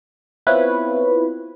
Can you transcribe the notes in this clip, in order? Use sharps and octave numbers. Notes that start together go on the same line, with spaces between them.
B3 C4 E4 F4 B4 C#5